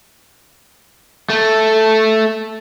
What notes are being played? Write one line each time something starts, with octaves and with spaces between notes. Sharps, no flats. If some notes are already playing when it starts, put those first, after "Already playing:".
A3